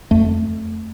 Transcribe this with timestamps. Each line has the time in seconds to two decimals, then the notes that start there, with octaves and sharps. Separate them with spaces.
0.11 F2 A3